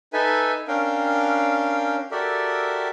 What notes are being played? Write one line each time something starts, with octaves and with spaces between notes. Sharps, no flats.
D#4 A4 B4 E5 G#5
C#4 D4 A#4 F5 G5
F#4 G4 A4 A#4 D5 E5